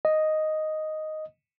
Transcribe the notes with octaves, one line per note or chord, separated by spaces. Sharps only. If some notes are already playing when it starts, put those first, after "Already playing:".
D#5